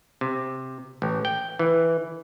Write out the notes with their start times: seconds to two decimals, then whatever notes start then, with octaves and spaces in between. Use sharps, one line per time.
0.21 C3
1.02 A1
1.25 G5
1.59 E3